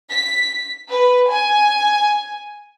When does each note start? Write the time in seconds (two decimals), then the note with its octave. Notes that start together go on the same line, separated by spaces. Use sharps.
0.10 B6
0.91 B4
1.31 G#5